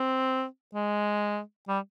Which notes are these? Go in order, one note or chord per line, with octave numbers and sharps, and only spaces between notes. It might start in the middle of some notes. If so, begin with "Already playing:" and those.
Already playing: C4
G#3
G3